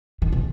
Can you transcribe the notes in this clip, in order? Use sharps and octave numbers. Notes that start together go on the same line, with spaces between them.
D#3
B2